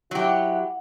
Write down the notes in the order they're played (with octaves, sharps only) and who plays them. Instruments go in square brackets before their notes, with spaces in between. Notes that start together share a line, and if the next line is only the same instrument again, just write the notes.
[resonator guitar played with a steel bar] F#3 G4 [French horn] E4 [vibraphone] F#5